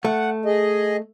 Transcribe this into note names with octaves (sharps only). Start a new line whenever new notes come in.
A3 F#5
G#4 D#5